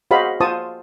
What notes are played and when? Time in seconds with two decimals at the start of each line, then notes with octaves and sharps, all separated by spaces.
0.11 F#4 G#4 C5 D#5 F5 B5
0.40 F4 C5 A5 C#6 D#6